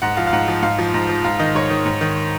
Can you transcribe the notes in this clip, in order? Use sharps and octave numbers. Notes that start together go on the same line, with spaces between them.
G#2 F#5
F3 F5
F5
G#2 F#5
F3
G#2 F5
F3
G#2
F3
G#2 F5
D#3 D#5
G#2 C#5
D#3
G#2
D#3